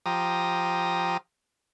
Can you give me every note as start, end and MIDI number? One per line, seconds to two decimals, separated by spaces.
0.06 1.17 53
0.06 1.17 67
0.06 1.17 82
0.06 1.17 87